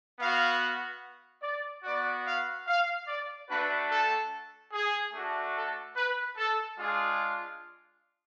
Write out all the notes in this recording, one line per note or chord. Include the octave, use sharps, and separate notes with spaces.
B3 F#4 F5
D5
B3 F#4 D5
F5
F5
D5
A3 D4 F#4 B4
A4
G#4
A3 D4 F#4
A4
B4
A4
G#3 D4 F4 G#4